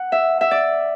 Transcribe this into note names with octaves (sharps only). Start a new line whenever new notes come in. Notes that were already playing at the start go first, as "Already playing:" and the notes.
Already playing: F#5
E5
E5
D5